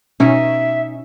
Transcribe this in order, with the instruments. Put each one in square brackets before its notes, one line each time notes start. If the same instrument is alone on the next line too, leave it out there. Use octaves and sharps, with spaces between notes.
[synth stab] B2 C#4 [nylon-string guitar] D#4 [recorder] E5